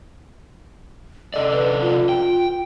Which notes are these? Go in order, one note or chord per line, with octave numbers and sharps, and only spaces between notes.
C3 A4 D5 D#5
B4
F4
G5